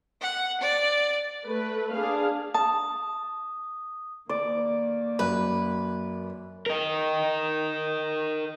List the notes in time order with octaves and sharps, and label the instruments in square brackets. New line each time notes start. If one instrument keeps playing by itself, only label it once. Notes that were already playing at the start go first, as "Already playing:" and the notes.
[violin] F#5
D5
[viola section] A3 B4
D4 G#4 F5
[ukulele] A5 [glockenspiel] D#6
[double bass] D#3 A#3 [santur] D5
[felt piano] F#2 [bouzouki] B4
[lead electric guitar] A#4 D#5